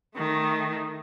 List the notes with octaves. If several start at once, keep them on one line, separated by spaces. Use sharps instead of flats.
D#3 A3